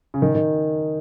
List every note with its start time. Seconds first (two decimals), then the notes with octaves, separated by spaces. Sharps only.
0.14 C#3
0.22 D#3
0.35 D#3